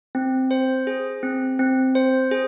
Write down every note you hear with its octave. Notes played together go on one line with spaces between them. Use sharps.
C4
C5
G#4
C4
C4
C5
G#4